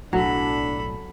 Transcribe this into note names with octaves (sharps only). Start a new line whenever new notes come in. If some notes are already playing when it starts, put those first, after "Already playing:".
B1 A2 F#3 D4 A4 B5